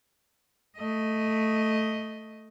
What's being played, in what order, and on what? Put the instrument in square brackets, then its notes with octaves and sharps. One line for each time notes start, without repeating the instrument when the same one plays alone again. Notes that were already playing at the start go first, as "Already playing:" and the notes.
[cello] A3 D#5